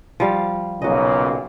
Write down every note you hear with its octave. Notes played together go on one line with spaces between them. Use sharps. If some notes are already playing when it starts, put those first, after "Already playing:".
F3 G3 F5
B1 A#2 C#3 F#4 D#5